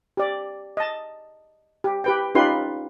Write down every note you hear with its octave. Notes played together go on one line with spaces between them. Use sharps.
G4 D5
D#5 A5
G4
G4 B4 G5
C#4 D#4 F4 G4 B4 C6